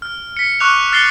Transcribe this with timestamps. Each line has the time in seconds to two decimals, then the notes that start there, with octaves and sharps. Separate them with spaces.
0.02 F6
0.37 B6 C#7
0.60 C#6 D6 F6 F#6 F7
0.92 F6 A6 C7 C#7 G7